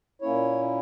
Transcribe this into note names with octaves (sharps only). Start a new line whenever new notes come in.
A#2 A#3 C#4 E4 C#5